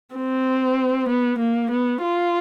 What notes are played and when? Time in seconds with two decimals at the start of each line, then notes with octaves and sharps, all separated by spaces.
0.16 C4
1.09 B3
1.39 A#3
1.71 B3
2.02 F4